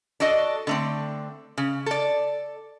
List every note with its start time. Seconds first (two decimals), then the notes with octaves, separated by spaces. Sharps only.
0.20 D4 F#4 A4 D#5
0.67 D3 A3 C4
1.58 C#3
1.86 A4 D5